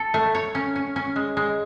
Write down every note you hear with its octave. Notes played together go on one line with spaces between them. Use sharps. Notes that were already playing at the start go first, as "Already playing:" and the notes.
Already playing: A4
A3
C#5
C#4
C#4
C#4
G#3
G#3